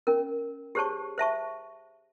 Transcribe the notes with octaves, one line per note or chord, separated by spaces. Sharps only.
C#4 A#4
G4 G#4 C5 C#5 A5 C#6
C5 E5 A5 C#6